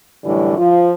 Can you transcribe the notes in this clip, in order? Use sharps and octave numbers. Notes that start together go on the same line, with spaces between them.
F#2 A2 D3 E3 G3
F3 F4